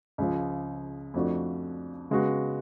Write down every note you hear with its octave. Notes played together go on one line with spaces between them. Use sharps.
C#2 C#3 F3
F2 F3 A3 D4 F#4
C#3 G#3 B3 F#4